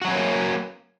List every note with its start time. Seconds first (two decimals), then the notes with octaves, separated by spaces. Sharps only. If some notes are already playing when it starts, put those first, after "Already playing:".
0.02 F#4
0.05 F#3
0.08 C#4
0.11 B4
0.14 A#3